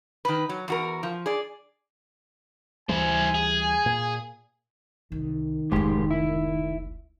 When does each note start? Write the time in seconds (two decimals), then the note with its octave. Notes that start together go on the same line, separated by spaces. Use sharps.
0.25 D#3 B4
0.49 F#3
0.68 E2 F#4 A#4
1.03 F3
1.26 G#4 D5
2.89 D2 E3 G3 E4 C5 G#5
3.35 G#4
3.86 A#2
5.12 C2 D#3
5.72 F1 C#2 G#2 G#3 G4
6.11 E4